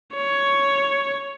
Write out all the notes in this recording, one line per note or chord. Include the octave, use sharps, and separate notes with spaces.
C#5